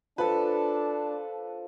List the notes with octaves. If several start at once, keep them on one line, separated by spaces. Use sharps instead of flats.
F3 D4 A4 B4 A5